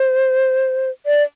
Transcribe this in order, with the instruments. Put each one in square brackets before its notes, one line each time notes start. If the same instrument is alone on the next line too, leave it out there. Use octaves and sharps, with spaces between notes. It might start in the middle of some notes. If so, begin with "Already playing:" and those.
Already playing: [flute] C5
D5